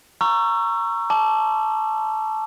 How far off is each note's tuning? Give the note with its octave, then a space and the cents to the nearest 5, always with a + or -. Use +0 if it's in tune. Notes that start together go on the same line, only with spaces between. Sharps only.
A#5 -5 C#6 +0 E6 +30
A5 -15 D6 +0